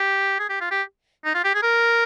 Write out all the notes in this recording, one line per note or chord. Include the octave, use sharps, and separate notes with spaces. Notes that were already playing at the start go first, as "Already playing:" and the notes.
Already playing: G4
G#4
G4
F4
G4
D#4
F4
G4
G#4
A#4